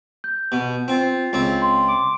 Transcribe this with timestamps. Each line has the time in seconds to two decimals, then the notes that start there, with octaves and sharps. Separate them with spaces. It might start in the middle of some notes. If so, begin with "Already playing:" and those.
0.24 G6
0.52 B2
0.88 C4 F4
1.33 C#2 C4
1.62 C6
1.88 D6